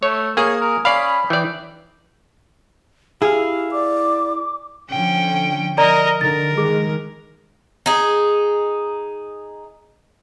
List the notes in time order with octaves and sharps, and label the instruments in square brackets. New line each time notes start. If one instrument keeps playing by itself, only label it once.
[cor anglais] A3 [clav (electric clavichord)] C#5
[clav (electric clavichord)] A#3 G#4 [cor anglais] C#5 [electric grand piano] G#5 D#6
[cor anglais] A#4
[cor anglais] C#4 [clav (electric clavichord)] D5 F5 [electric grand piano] B5 C7
[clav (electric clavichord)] E3 D5 [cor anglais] G5
[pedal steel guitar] E4 F5 [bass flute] G4 [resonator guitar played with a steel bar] G#4
[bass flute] D5 [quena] D6
[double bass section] D3 F3 [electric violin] C#4 G5
[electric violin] A#4 D#5 [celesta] D5 A#5
[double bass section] D3 D#3 [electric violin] A#4 [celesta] A6
[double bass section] D#3 G#3 [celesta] G#4
[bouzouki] D#4 G#4